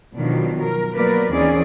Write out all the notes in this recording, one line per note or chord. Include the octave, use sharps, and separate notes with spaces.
B2 D#3 F3 F#3 D4
A#4
F#3 A#3 B3 A#4 B4 D5
D#2 E3 C4 C#4 G#4 D5